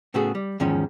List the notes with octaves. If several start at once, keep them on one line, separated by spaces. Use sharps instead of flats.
A2 C#3 A3 B3 F#4 G#4
G3
E2 G#2 D#3 F3 C#4